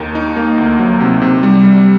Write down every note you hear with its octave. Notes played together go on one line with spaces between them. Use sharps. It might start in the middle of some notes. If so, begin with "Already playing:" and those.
Already playing: D#2 D#3 D#4
D#4
A#3
D2
F#3
C3
C3
G3
G3